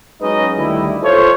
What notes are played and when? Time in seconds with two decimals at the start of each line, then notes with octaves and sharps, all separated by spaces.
0.21 F#3 G#3 C#4 D#4 B4 D#5
0.57 D2 D#3 G3 A3 E4
1.03 F4 A4 C5 C#5